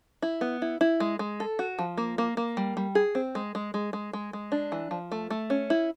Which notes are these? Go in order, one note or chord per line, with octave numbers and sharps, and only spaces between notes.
E4
B3
E4
E4
G#3
G#3
A4
F#4
F3
A#3
A#3
A#3
G3
G3
G#4
C4
G#3
G#3
G#3
G#3
G#3
G#3
D4
E3
F3
A3
A3
C#4
E4